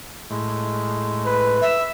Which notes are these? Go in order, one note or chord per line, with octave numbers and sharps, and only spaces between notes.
A2 G#3
B4
E5